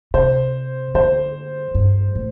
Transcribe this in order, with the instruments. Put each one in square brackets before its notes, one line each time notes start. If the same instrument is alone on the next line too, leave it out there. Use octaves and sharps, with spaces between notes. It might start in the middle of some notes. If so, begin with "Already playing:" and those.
[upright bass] C3 [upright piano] C5
[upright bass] D3 [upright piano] C5
[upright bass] G2
A2